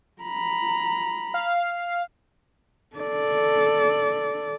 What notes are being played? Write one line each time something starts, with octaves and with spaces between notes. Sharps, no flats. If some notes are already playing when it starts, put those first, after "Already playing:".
A#5 B5
F5
A4 D5